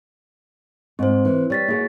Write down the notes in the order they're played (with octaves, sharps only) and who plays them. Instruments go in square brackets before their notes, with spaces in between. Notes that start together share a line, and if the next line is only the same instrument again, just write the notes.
[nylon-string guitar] G#2 [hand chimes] C4 C5
[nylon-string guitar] E3
[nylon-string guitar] G3 [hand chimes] C#5 A6 B6
[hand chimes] A#3 G#4 [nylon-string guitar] E4 F#4